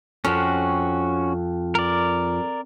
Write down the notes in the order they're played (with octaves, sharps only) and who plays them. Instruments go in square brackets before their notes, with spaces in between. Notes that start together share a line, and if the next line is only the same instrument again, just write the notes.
[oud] F2 [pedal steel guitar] C#4 F#4
[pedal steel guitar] A#4 D5